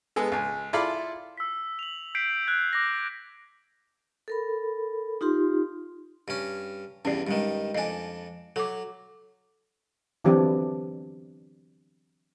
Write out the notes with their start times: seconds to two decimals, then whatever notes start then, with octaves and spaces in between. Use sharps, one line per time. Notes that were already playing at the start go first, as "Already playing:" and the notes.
0.16 G#3 B3 G#4 A4
0.32 C#2 G#5
0.73 E4 F4 A4 D5 F5 B5
1.38 E6 B6
1.79 F7 F#7
2.15 G6 B6 C7 D7
2.47 F#6 G#6
2.73 D6 A#6
4.28 A4 A#4 B5
5.21 D#4 F4 G4 C6
6.28 G2 C#4
7.05 E2 G2 C#4 D5
7.27 G2 D#3 G3 G#3
7.75 F2 D4 D#5 G#5
8.56 F#3 A4 D6
10.24 D3 E3 F#3 C4 D4 G4